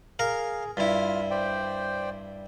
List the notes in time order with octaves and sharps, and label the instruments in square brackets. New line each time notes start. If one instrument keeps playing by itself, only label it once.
[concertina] G#4 [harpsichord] A#4 F5
[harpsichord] G2 E4 [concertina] F4 F6
[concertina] C5 D5 G5